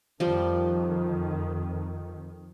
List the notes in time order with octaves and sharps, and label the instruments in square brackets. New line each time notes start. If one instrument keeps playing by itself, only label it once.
[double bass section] F2 D#3 [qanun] F3 G3